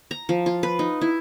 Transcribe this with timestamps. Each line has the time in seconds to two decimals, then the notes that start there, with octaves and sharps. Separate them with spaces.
0.11 A#5
0.29 F3
0.46 F4
0.63 B4
0.79 D#4
1.01 E4